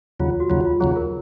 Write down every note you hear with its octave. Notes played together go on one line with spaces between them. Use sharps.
D#2 C#3 F#3 F4
F#4
D#2 C#3 F#3 F4
F4
D#2 C#3 F#3 G#4
A#4